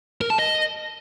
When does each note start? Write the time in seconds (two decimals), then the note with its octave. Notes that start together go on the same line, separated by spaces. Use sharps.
0.21 A#4
0.30 A5
0.39 D#5